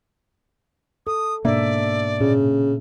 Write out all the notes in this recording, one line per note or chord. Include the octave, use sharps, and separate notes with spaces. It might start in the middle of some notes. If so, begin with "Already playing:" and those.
A4 D#6
G#2 B2 A#3 D4 D5 E5
A#2 C#3